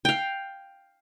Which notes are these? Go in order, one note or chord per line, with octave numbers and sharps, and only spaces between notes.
F5 G5